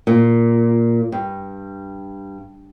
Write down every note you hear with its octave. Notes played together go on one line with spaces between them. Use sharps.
A#2
G2